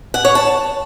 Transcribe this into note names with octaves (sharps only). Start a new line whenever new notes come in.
F#5
C#5
A5